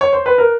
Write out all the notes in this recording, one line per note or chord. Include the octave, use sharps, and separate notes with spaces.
C#5
C5
B4
A#4